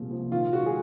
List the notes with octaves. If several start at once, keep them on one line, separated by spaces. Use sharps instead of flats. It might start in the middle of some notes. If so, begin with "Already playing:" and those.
Already playing: C2 A#2 F3 G#3
F3
D#3 F4
G#3 F#4
G#4